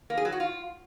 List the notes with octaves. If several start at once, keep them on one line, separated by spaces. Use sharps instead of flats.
A#3
G#4
F#3
F#4
F4